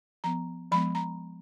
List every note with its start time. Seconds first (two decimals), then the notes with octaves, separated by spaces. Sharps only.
0.24 F3 B3 A#5
0.71 F3 G#3 B3 B5
0.95 A#5